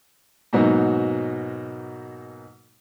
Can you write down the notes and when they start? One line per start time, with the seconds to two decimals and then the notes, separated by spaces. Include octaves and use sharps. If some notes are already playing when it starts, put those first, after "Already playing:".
0.53 G#2 B2 F#3 A#3 D#4